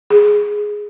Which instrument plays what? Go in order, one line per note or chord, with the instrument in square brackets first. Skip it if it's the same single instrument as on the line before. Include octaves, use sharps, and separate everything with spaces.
[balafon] G#4